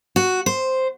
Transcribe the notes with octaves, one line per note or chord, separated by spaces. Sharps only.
F#4
C5